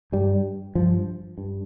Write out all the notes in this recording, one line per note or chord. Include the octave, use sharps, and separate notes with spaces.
G2 G3
G2 F3
G2